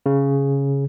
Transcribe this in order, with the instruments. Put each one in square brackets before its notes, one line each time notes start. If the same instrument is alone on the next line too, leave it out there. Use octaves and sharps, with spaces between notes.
[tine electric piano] C#3